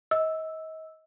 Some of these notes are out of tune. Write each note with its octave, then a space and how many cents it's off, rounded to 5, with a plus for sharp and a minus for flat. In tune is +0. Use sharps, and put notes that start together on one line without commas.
D#5 +35 E6 +0